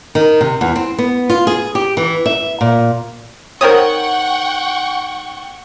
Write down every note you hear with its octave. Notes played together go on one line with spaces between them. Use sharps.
D#3
C3
E2
C4
B3
F4
G#4
G4
E3
E5
A#2
D#3 C4 A#4 C#5 F#5 G5 C#6 D#6